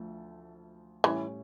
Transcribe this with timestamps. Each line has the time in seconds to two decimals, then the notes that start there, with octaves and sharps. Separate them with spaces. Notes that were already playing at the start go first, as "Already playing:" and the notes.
Already playing: D2 F3 A3
1.04 A2 E3 G3 C#4